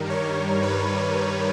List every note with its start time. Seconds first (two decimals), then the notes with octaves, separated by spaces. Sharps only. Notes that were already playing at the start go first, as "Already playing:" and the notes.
Already playing: G2 D#3 G3 A#4
0.10 C#5
0.63 B4